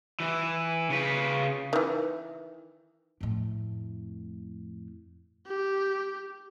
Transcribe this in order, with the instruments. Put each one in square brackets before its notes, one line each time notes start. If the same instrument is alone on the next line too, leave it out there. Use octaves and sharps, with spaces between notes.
[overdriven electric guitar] E3
C#3 B4
[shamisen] D#3 E3
[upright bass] F2 A2
[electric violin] G4